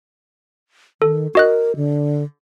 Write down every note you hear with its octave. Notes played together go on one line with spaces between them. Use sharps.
D#3 A4
F#4 A#4 D#5 F#6
D3